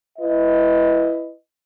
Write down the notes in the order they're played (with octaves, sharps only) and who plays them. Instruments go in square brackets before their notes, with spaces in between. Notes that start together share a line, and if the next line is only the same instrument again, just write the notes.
[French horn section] E4 B4 D#5